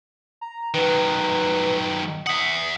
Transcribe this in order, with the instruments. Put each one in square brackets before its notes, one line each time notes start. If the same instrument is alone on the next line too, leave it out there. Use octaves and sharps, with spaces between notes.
[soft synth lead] A#5
[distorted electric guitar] D#3 F#3 [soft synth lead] B4
[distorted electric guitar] E5 F#5 [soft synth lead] D#6